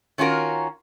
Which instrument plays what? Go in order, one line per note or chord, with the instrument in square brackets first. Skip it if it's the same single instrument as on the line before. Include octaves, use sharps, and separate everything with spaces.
[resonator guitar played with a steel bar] D#3 C#4 F4 F#4 A#4